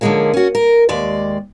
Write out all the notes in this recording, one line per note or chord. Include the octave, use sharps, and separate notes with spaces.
D3 F3 G3 G#3 A#3 C#4
C#4 F#4
A#4
D#2 G#3 D5